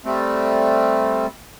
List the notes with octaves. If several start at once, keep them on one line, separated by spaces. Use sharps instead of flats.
G3 A3 C4